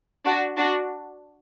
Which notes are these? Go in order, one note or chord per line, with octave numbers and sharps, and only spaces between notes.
D4 F#4
D4 F#4